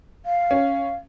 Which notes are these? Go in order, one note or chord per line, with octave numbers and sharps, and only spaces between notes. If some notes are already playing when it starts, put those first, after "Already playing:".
F5
C#4